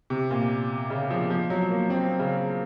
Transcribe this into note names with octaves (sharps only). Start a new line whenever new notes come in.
C3
A#2
C#3
F3
F3
F#3
A#3
C4
C#3